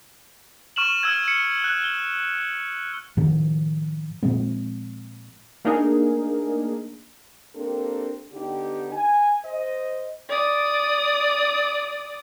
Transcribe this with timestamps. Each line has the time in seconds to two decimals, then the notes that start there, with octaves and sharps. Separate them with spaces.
0.76 C#6 F6 E7 F#7
1.03 E6 F6 G#6
1.28 C#7
1.64 F#6
1.84 G7
3.17 A2 D#3 F3
4.23 A#2 F3 G#3 C4
5.65 A3 A#3 D4 D#4 G#4 A#4
7.54 A#3 C4 D4 G4 A4 A#4
8.32 D3 B3 D#4 G4
8.92 G#5
9.44 C5 D#5
10.29 D5 D#6